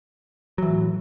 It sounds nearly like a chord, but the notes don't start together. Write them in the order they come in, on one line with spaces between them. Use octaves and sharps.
F#3 E3 A2